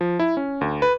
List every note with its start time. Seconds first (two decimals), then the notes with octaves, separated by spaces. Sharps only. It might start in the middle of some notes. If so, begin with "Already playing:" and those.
0.01 F3
0.19 E4
0.37 C#4
0.61 D2
0.82 B4